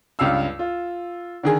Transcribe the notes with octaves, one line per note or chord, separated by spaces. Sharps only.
C#2 G2 F5 E6
F4
D3 D#3 G#4